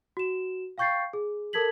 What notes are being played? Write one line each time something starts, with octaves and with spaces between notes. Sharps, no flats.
F#4 E7
F5 G5 C#6 G6 A6 C7
G#4
A4 A#4 A5 G#6 B6 F#7